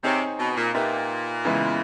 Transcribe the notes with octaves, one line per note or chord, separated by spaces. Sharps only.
C3 C4 D#4 G#4 C#5
B2
A#2
A#2 A#3 D#4 G4 B4 E5
C#3 E3 G#3 B3 E4